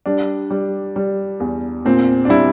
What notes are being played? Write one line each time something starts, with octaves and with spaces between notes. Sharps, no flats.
G3 D4
G3
G3
E2
A#2 C4
D4
G3 E4